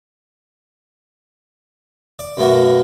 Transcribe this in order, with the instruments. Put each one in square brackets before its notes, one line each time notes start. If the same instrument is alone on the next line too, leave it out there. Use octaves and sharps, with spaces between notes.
[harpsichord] D5
F#2 B2 A3 A#3 F#4